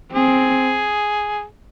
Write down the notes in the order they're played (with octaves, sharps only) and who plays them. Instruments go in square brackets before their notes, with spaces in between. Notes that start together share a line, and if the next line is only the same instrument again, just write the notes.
[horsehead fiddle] C4 [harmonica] G#4